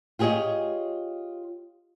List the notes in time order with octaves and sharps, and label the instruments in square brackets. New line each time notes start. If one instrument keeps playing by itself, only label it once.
[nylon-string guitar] F4 G4 G#4 A#4 C#5 D#5